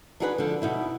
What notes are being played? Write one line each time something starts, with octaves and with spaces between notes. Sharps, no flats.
D4 D#4 F#4 G#4 A4 B4
D3 F3
B2 D#4 E4